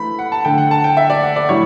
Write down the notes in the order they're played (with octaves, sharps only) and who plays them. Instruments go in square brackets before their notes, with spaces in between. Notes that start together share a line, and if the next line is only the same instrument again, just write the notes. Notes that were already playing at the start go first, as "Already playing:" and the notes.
Already playing: [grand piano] E3 A3 B5
F#5
A5
D3 A3 G5
F#5
A5
G5
E5
D5
F#5
D5
A2 G3 C#5